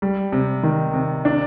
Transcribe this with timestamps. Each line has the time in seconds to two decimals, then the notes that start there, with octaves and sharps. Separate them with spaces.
0.02 G3
0.32 C3
0.63 D#3
0.93 C3
1.25 D4